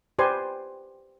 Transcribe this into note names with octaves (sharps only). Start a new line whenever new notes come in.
G4 B4 C5 D5 G#5 C6